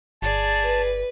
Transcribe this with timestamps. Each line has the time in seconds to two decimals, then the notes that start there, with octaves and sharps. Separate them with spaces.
0.22 G1 G#4 D5 A5
0.64 B4